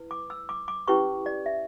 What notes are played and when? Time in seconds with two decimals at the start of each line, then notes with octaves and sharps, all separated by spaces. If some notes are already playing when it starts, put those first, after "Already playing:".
Already playing: E4 B4
0.11 D6
0.30 E6
0.49 D6
0.68 D6
0.88 C#4 E4 G4 B4 C#6
1.26 D5
1.46 E5